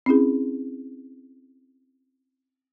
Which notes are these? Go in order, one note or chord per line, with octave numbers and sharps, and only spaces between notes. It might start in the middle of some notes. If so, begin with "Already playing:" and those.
C4 C#4 E4 G#4